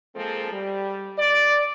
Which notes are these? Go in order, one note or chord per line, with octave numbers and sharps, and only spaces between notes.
F3 G#3 A#3 C4 A4
G3
D5